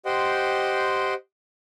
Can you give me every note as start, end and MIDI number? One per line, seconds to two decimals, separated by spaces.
0.06 1.14 67
0.06 1.14 72
0.06 1.14 75
0.06 1.14 78
0.06 1.14 79
0.06 1.14 84